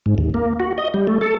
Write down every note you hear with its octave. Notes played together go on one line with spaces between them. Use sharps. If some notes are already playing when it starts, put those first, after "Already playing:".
G#2
D#2
A#3
F#4
D#5
G3
A3
A4